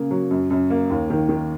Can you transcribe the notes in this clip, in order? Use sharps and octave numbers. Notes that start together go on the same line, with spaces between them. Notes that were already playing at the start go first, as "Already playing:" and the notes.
Already playing: C#3 A#3
F#3
F#2
F#2
A#3
D#2
D#3
D#3